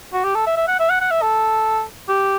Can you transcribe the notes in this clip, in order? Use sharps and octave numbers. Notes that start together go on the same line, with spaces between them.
F#4
G4
A4
E5
E5
F#5
E5
F#5
F#5
E5
A4
G4